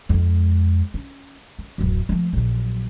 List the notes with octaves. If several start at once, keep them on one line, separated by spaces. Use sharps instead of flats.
F2 G#3
C#4
C#4
D1 F#2
F3 A3
A#1 F#3